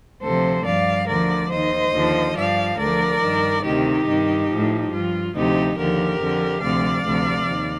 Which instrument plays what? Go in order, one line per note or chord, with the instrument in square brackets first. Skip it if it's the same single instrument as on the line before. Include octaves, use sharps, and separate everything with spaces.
[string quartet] D2 C3 F3 A4 C5
G2 F3 D5 F5
D2 D3 F3 A#4 D5
D#2 D#3 C5 D#5
D#2 D3 F3
G2 F3 D5 F5
D2 D3 F3 A#4 D5
G2 D#3
D2 C3 D#3 D#4 G4
G2 D#3
A2 F3
G2 F3 F4
D2 C3 F3 D#4 G4
D#2 D3 F3 G4 A#4
F2 D3 F3
D2 C3 F3 D5 F5
D2 C3 F3
D#2